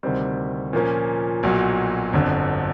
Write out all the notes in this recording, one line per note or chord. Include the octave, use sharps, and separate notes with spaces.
D2 C3 D#3 G3 C4
A#2 F3 A#3 C#4
B1 A#2 F#3
G1 F2 D3